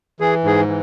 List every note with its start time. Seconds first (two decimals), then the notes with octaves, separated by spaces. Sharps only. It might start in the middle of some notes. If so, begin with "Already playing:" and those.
0.20 E3 G#4
0.44 G#2 G#4
0.68 E3